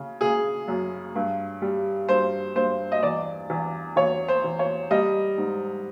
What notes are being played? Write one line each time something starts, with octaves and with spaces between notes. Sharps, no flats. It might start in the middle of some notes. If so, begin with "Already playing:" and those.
Already playing: C#3
C#3 G#4
F#2
G2
G3
G2 C5
G2 C5
D#5
E2 D5
E2
E2 C#5
C5
E2
C#5
G3 D#5
G#2